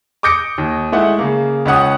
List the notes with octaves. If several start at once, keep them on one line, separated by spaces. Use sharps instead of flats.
D6 D#6 G6 A#6 C#7 D7
D#2
G#3 A3 E4 F#5
C#3 A#3
C#2 C#4 F#5 D#6